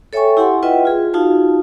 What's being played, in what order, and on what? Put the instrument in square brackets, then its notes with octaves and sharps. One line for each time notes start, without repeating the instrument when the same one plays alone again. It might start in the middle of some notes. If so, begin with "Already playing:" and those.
[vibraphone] A4 C#5 E5 G5 G#5 C#6
E4 G4 F#5 G#5 C6
F4 B4 D#5 E5 F#5 G5
F4 G#4
D#4 F4 F#4 F5 A5